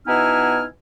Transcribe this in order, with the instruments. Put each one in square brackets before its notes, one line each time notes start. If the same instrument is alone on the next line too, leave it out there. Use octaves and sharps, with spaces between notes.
[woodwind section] B2 B3 D#4 E4 G#5 F6